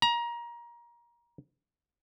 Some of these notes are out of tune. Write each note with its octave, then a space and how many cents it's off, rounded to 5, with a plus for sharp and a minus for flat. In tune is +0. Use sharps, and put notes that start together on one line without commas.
A#5 +25